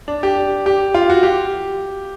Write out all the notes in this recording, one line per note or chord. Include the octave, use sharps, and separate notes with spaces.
D4
G4
G4
F4
F#4
G4